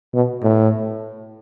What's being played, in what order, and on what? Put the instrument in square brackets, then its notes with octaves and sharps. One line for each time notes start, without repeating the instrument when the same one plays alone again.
[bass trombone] B2
A2